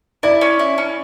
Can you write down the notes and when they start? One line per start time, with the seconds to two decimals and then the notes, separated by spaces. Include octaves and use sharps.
0.23 E4 D5
0.41 C#4
0.59 E4
0.78 C#4